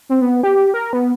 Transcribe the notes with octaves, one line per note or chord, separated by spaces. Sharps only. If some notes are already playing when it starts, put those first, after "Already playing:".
C4
B3
G4
A#4
B3